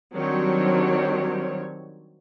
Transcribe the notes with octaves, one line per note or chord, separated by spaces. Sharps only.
D#3 F#3 G3 C4 D4 C#5